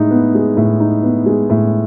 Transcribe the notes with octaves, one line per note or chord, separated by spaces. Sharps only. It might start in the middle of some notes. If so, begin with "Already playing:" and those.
Already playing: A2 G#3 D#4
B3
G#3
A2
D#4
B3
G#3
A2